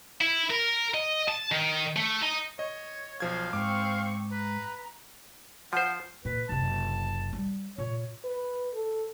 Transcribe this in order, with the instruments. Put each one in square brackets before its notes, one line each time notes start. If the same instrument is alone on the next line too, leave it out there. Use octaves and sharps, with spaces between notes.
[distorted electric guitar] E4
A#4
D#5
A5
D#3
A3
D#4
[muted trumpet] C#5 [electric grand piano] D#5
[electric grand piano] B1 F3 G#6 [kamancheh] C5 [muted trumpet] F5
[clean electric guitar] G#2 [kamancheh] C4 C#6 [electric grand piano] D6
[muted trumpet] B4 [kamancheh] A#5
[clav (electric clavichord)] F3 C5 [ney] F#5
[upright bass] A#2 [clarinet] B4
[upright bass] F#1 C3 [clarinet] A5
[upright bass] G3 G#3
[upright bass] A#2 [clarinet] C#5
[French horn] B4
A4